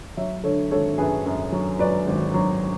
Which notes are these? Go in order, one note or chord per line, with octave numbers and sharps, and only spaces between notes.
F#3 C#5 E5
D3 A4 C#5
G#1 A4 C#5
F#2 G#4 B4
F#2
F#3
F#3 B4 D5
G#1
F#3